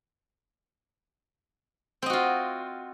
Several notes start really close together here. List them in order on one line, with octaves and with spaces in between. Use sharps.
C4 D#5 F#4 F4